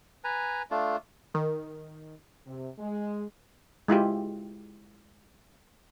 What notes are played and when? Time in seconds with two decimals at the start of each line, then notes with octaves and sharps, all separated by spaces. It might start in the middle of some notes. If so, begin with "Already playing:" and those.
0.24 B4 G#5 A#5
0.71 A3 D4 F4
1.34 D#3
2.47 C3
2.79 G#3
3.88 G#3 E4 F4 G4